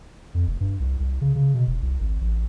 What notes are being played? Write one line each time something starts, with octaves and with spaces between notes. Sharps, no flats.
F2
F1
G2
C2
C2
C#3
C#3
B2
E1
C2
G#1
A1